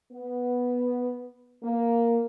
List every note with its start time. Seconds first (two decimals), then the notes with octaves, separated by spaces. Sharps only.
0.13 B3
1.62 A#3